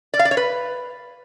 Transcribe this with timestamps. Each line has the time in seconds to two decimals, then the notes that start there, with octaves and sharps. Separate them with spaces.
0.14 D5
0.19 F5
0.25 D5
0.31 C#5
0.37 B4